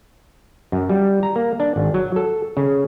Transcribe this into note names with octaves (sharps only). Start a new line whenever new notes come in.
F#2
G3
A#5
A#3
D4
G#1
F#3
A4
C#3